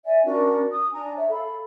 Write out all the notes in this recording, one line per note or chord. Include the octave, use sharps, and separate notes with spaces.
D5 E5 G#5
C#4 D4 F#4 A#4
D#6
D4 G#5 A#5
C#5 E5
A4 F5 B5